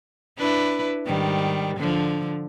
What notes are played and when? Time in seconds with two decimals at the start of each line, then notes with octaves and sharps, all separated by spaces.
0.38 D4 E4 B4
1.06 G#2 D#3 G3
1.76 D3 F3